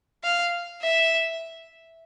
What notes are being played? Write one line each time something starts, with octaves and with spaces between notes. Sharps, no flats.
F5
E5